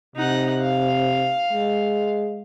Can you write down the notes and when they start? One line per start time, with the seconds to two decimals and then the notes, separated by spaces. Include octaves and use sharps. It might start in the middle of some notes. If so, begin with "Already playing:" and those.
0.16 C3 D#4 F#5
0.62 F5
1.53 G#3